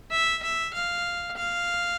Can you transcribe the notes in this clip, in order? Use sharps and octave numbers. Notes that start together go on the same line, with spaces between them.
E5
E5
F5
F5